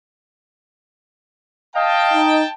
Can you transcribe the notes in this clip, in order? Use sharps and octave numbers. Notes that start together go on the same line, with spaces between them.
D#5 F5 G5 A5
D#4